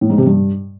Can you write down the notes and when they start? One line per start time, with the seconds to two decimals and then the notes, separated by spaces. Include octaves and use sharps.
0.01 A2
0.10 G#2
0.18 C3
0.26 G2